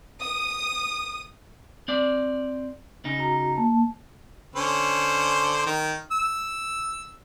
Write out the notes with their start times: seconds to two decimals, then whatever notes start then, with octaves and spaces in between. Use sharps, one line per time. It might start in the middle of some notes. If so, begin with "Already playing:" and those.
0.22 D#6
1.88 C4 D5
3.05 C#3 D#4
3.18 F#4 A#5
3.57 A#3 A5
4.56 D3 C#4 C5
5.66 D#3 A#4
6.11 E6